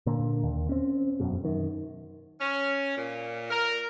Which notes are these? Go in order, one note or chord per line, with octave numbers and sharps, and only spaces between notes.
A#2 D3 A#3
D#2
C4 C#4
E1 F#2 B2
F#2 D#3
C#4
A#2
A#4